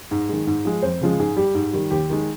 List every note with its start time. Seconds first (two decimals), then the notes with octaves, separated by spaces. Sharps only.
0.11 G#2
0.29 D#3 G#3
0.47 G#2
0.65 F3 G#3
0.82 F2 C5
1.01 C#3 F3 G#3
1.19 G#2 G#4
1.37 G3 G4
1.55 G#2
1.73 D#3 G3
1.91 D#2 G4
2.10 D#3 G#3